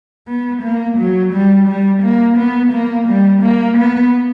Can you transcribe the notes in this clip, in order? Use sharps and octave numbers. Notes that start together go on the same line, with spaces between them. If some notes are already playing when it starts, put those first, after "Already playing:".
B3
A#3
F#3
G3
G3
A#3
B3
A#3
G3
A#3
B3